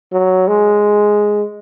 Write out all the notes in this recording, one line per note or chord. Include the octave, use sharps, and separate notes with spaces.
F#3
G#3